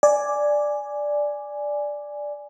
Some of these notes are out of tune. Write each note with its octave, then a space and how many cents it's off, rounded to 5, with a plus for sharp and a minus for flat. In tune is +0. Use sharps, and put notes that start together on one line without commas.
D5 +0 G#5 +0